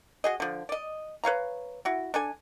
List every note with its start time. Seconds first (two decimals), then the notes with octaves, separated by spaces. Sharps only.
0.24 F#4 G#4 D#5
0.40 D3 F3
0.69 D5 D#5
1.24 B4 C#5 F5 A#5
1.85 E4 F#4
2.14 D4 A4 G#5